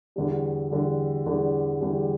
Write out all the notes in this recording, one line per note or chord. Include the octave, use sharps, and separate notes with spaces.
E2 D3 G3
E2 D3 G3
E2 D3 G3
E2 D3 G3